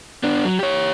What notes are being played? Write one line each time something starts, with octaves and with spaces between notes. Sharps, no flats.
B3 D4
F#3
G4 C#5